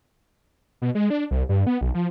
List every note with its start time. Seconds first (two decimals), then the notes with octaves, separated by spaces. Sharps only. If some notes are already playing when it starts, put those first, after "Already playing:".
0.82 B2
0.95 G#3
1.10 D4
1.31 C2
1.49 G2
1.67 B3
1.81 B1
1.94 F3